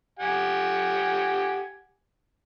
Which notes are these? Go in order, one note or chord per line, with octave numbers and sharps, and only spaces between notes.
G4 F#5 G#5